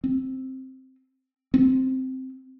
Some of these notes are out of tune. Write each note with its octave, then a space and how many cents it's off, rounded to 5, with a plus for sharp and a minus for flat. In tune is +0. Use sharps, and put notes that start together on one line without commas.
C4 +5
C4 -5